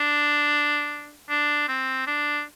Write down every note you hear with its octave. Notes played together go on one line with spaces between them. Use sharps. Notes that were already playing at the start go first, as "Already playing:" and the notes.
Already playing: D4
D4
C4
D4